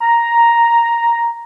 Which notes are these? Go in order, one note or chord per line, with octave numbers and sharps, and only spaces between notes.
A#5